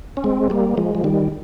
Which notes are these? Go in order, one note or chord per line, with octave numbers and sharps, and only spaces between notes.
C#4
G#3 C4
G3 A#3
F3 G#3
F3
D#3 G3